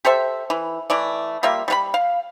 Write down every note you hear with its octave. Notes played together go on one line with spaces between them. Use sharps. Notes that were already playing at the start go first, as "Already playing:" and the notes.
G4 A4 C5 E5
E3
E3 A3 D5
G3 A#3 F4 E5
G3 B4 B5
F5